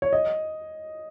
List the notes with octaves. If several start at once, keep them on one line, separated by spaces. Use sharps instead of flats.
C#5
D#5